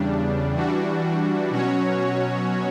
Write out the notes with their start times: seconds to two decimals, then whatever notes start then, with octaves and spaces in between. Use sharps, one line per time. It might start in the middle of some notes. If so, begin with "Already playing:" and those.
Already playing: E2 C#3 G3 D4
0.54 E3 G3 D4 F#4
1.50 B2 F#3 C#4 F#4 C#5